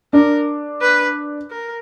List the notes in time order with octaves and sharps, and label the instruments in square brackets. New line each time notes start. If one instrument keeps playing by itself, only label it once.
[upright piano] D4 [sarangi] A#4
[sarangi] B4
A#4